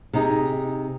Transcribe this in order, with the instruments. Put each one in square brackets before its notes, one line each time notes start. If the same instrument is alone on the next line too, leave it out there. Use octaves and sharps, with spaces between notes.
[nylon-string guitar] C3 D#4 G#4